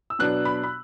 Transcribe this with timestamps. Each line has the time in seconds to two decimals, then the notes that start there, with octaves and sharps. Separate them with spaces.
0.10 E6
0.19 B2 F#3 B3 D4 F#6
0.45 B5
0.63 B5